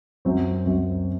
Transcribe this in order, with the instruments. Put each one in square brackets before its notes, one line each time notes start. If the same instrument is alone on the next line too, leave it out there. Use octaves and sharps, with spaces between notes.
[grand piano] F#2 F#3 C4
F#2 F#3 C4